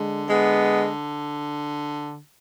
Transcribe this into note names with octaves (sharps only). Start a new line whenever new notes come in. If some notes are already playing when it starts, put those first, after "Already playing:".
Already playing: D3 G#3
G#3 B3